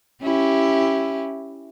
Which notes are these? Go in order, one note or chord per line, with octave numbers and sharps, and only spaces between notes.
C#4 E4 G4